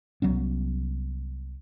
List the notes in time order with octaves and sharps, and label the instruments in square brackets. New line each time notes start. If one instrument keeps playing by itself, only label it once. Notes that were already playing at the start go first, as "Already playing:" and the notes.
[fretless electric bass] C2 F#3 B3 C#4